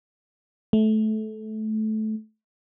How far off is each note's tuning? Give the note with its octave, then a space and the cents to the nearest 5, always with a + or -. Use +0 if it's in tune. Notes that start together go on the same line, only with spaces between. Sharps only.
A3 -20